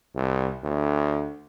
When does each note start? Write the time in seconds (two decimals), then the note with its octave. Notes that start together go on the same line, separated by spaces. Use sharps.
0.15 C2
0.63 D2